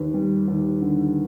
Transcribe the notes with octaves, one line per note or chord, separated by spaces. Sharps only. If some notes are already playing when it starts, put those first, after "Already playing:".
Already playing: D#2 B4
G3
D#2
D3